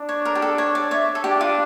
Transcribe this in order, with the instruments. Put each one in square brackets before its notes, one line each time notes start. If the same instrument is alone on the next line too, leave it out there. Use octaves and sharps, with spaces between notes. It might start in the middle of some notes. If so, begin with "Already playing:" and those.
Already playing: [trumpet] D4
[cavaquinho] C#5
A#4
G4
A4
C#5
D5
C#5 E5
A4
[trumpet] D4 [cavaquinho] G4
[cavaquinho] F4